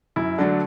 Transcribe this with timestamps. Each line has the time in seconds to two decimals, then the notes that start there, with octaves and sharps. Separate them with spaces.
0.16 F#2 E4
0.38 D3 F#3 A3 D4